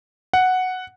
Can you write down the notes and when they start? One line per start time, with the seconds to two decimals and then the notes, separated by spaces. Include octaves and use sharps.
0.33 F#5